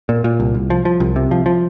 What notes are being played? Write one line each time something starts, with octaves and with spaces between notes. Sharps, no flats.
A#2
A#2
C2
C2
F3
F3
C2
C3
F3
F3